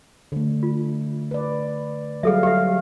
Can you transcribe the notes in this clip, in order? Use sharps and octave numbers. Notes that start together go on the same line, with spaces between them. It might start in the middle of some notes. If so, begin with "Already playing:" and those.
D3 A3
F4
B4 D5
F#3 G3 G#4 A4 E5 F5
G4 E5 F5